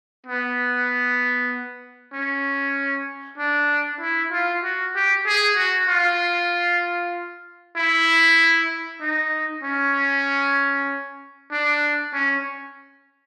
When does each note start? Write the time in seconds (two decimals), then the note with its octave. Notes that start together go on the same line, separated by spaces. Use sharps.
0.26 B3
2.13 C#4
3.38 D4
4.01 E4
4.32 F4
4.64 F#4
4.95 G4
5.26 G#4
5.57 F#4
5.88 F4
7.76 E4
9.01 D#4
9.63 C#4
11.52 D4
12.14 C#4